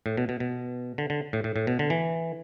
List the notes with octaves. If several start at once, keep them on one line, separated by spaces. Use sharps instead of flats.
A2
B2
B2
B2
D3
D3
A2
A2
A2
B2
D3
E3